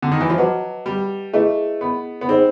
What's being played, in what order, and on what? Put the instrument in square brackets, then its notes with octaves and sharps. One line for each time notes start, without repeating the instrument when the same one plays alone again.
[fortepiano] D3
D#3
E3
F3
[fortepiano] F#3 [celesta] B4 D#5 F#5 A5 D6
[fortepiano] G3
[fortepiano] A3 [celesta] E4 G#4 B4 D#5
[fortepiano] B3
B3
[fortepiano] C4 [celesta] D#4 G#4 C5 D#5 F#5